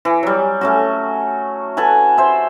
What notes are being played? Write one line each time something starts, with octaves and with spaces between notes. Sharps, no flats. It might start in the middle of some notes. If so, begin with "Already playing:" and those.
E3
F#3 G3
A3 C#4 F#4
A4 B4 F#5 G#5
C5 E5